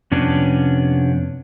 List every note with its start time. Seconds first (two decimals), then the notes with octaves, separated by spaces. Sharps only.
0.11 F2 C3 B3 C#4 D4